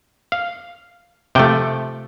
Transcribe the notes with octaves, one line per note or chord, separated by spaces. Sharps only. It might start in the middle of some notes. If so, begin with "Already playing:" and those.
F5
C3 F3 A3 G5